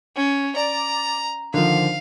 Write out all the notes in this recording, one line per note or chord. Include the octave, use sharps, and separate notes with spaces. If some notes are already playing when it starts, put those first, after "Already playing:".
C#4
D5 A#5
D3 D#3 F3 F5